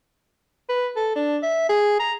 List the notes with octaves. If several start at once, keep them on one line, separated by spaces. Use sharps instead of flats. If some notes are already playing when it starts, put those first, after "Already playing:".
B4
A4
D4
E5
G#4
A#5